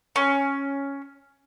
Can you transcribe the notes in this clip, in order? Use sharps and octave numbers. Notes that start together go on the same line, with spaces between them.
C#4